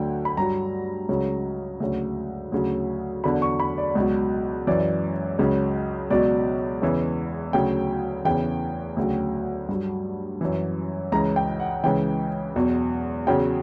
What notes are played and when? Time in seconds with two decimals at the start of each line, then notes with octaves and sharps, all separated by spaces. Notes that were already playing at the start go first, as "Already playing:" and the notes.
Already playing: D2 D3 F#3 G5
0.25 B5
0.37 G2 F#3 A#5
1.09 C#2 C#3 F#3
1.80 D2 C#3 F#3
2.52 D2 C#3 F#3
3.24 E2 D3 F#3 B5
3.42 C#6
3.60 B5
3.78 D5
3.95 C#2 B2 F#3
4.67 F#2 E3 D5
5.39 C#2 C#3 F#3
6.10 C#2 B2 F#3 D5
6.82 E2 C#3 E3
7.53 D2 C#3 F#3 G5
8.25 E2 C#3 E3 G5
8.97 D2 C#3 F#3
9.69 G2 F#3
10.41 F#2 E3
11.12 C#2 C#3 E3 A#5
11.36 G5
11.60 F#5
11.84 C#2 C#3 E3 G5
12.56 E2 B2 F#3
13.27 E2 C#3 F#3 G5